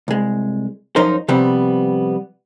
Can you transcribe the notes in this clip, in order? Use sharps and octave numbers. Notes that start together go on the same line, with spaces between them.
C2 G#3
F#2 F3 C#4 D#4 A#4 C5
C3 F3 G3 B3 C4